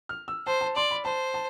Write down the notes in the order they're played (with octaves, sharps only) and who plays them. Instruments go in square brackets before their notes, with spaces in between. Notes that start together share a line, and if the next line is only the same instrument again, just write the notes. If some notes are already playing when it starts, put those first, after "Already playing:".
[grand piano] F6
E6
[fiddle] C5 [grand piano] A5
[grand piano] A5
[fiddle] D5 [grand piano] C6
[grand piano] B5
[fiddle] C5 [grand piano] A5
[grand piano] A5